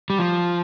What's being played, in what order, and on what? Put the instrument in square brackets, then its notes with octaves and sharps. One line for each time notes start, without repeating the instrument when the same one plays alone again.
[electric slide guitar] G3
F3